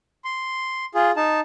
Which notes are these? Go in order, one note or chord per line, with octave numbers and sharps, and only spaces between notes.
C6
F4 G#4
D#4 A5